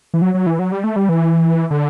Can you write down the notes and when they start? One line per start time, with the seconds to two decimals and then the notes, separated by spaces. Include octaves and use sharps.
0.14 E3
0.22 F#3
0.34 F#3
0.46 E3
0.59 F#3
0.72 G3
0.84 A3
0.96 G3
1.09 E3
1.71 D3